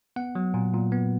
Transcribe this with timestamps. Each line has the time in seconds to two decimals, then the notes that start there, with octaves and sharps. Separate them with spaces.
0.16 B3 F#5
0.35 F#3
0.54 A#2
0.74 A#2
0.92 B3